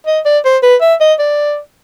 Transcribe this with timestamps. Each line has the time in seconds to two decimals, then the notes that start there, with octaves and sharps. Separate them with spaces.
0.07 D#5
0.25 D5
0.45 C5
0.63 B4
0.81 E5
1.00 D#5
1.19 D5